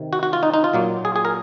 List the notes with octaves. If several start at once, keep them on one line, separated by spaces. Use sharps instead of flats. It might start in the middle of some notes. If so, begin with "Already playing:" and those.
Already playing: C3 D#3
F#4
F#4
F4
D#4
D#4
F4
A#2 F#3 A#3
G#4
G#4
A#4